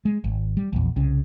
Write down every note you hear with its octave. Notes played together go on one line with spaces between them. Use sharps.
G#3
G#1
G3
A#1 E2
C2 C#3